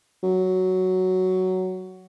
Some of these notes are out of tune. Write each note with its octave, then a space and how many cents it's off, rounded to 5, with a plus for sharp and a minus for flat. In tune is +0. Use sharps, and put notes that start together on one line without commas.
F#3 +5